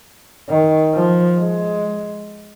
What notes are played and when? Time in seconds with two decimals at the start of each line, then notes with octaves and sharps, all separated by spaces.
0.49 D#3
0.93 F3
1.38 G#3